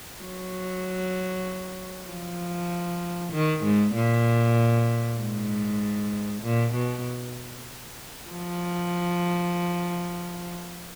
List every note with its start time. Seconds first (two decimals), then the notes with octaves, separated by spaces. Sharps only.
0.22 F#3
2.09 F3
3.32 D#3
3.63 G#2
3.94 A#2
5.19 G#2
6.43 A#2
6.74 B2
8.29 F3